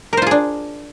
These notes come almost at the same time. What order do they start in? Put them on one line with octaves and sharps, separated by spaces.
A#4 C5 F4 G#4 D4